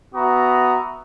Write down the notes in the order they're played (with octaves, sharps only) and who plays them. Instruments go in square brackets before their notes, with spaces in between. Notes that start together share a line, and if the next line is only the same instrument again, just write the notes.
[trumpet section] B3 F#4 E5 A#5 D#6